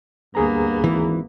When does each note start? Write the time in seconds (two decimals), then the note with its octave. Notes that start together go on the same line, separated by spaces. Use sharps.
0.35 D2 G2 A#3 B3 G#4 A#5
0.84 G#1 E3